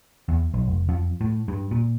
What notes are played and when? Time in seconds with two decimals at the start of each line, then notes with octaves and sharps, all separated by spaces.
0.28 E2
0.54 B1
0.68 F1
0.89 F2
1.21 A2
1.48 G2
1.71 A#2